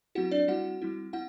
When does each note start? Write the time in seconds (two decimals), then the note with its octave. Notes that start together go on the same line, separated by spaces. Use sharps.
0.15 F#3 C4 E4 F#4 F#5
0.31 D4 D5
0.48 G3 C4 E4 F#4 F#5
0.82 G3 C4 E4
1.13 C4 E4 F#5